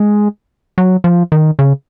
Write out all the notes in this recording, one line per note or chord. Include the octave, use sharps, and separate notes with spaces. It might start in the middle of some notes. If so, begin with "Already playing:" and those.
Already playing: G#3
F#3
F3
D#3
C#3